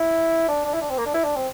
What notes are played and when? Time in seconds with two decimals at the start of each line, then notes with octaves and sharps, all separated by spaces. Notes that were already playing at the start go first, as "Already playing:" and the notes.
Already playing: E4
0.48 D4
0.65 D4
0.74 E4
0.81 D4
0.90 C4
0.98 A#3
1.06 D4
1.14 E4
1.24 D4
1.36 C4